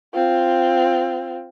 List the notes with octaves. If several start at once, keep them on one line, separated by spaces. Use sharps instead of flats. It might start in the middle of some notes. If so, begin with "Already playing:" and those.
C4 F4